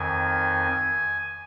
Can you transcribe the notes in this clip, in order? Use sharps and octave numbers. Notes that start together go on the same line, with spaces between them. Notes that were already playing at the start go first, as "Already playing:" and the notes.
Already playing: F2 D#3 G#5